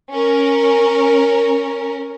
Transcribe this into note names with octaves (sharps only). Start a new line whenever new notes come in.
C#4 A#4